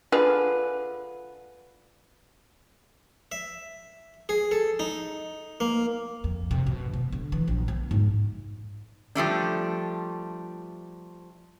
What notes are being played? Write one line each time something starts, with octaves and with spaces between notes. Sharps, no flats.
D3 F4 G#4 B4
E5
G#4
A4
D#4
A#3
F2
C3
B2
B3
D3
E3
A#1
B3
G#2
F3 G3 A3 D4